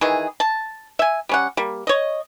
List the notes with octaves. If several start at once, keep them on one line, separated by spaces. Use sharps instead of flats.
D#3 E3 G#4
A5
E5 G#5
G3 C#4 F#5
G3 A#3
C#5 D#5